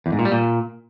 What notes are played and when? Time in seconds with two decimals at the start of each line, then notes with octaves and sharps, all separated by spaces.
0.06 E2
0.12 G#2
0.19 A#2
0.25 G3
0.32 A#2